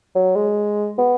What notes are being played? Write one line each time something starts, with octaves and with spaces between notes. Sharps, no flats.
F#3
G#3
B3